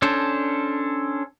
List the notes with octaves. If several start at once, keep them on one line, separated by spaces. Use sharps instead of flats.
C#4 D4 A4 C5